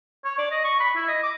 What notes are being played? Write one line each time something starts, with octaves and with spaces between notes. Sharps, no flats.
C#5
D5
D#5
C#6
B5
E4
D#5
D6